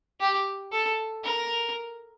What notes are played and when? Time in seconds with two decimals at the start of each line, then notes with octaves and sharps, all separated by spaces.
0.21 G4
0.72 A4
1.25 A#4